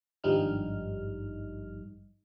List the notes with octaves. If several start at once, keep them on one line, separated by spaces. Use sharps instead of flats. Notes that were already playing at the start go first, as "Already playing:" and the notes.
G#1 G2 F3 G3 D#4 F6